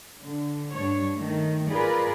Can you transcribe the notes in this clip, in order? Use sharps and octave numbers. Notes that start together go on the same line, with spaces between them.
D3
G2 D4 C#5
D#3 A3
F4 G#4 A#4 B4 D5